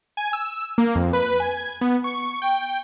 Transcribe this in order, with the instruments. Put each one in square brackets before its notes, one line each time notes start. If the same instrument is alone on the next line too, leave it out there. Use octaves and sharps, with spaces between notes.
[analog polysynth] G#5
E6
A#3
F2
B4
G#5
G#6
B3
C#6
G5